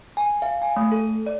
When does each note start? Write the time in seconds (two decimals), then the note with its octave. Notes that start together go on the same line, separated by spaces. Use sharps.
0.17 G#5
0.42 F5
0.62 G#5
0.76 A3
0.92 A4
1.26 D5